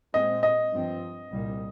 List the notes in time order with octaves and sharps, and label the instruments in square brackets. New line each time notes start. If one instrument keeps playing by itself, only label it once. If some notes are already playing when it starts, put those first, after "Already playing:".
[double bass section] A#2 G#3 C4 [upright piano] D#5
[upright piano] D#5
[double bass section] G2 F3 C4
C2 A#2 G3